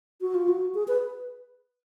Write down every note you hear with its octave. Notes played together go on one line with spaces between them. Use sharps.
F#4
F4
F#4
G#4
B4